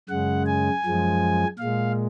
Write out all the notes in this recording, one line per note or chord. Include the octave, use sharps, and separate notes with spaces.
F#2 C#3 G#3 F#5
G#5
F#2 F3 G#3
A#2 G#3 F5